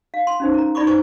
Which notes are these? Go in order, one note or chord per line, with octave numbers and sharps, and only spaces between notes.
F5
C6
C#4 D#4 C5
A#4 A#5
D#4 E4 D5 B5 C#6 D6
D#4 B4 C5 G#5 C#6 D6